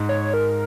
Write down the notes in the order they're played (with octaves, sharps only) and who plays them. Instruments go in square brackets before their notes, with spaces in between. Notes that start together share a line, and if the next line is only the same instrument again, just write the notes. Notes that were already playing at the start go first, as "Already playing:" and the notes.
Already playing: [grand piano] G#2
[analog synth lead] C#5
A#4